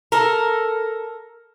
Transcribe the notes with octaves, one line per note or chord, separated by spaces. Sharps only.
A4 A#4